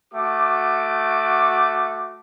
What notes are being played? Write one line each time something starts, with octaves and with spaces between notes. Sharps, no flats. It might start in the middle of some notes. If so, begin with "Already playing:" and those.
A3 F#4 D6